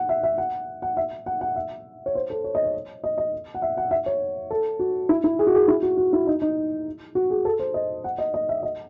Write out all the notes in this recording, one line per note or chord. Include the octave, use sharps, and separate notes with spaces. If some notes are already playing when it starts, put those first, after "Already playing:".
Already playing: F#5
E5
E5
F#5
F#5
E5
F#5
F#5
E5
C#5
C5
A4
C#5
D#5
C#5
D#5
D#5
F#5
E5
F#5
E5
C#5
A4
F#4
E4
E4
G#4
F#4
G#4
E4
F#4
F#4
E4
D#4
D#4
F#4
G#4
A4
C5
D#5
F#5
D#5
D#5
E5
D#5